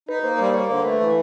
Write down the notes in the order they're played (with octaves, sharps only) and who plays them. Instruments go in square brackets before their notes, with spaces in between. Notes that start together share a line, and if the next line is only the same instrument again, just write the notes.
[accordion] D#4 [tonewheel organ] B4
[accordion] A#3 [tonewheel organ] C5
[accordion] G3 [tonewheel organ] C5
[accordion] A#3 [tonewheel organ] C#5
[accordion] D3 [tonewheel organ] C5
[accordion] A3 [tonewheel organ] B4
[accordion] E3